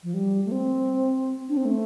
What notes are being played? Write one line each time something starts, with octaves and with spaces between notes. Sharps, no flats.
F3
G3
A3
C4
D4
C4
A3